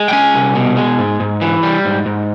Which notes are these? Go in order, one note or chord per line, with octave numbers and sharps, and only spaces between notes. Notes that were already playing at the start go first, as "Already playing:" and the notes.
Already playing: G#3
G5
C#4 G#5
C2
B2
G#3
G#2
G#2
E3
G3
G#2
G#2